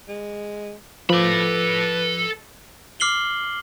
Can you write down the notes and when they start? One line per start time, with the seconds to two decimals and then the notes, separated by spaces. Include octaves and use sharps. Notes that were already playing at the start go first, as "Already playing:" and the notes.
0.08 G#3
1.10 F3 A4 B4 B5 D6
3.00 D6 F6 C7 F#7 G7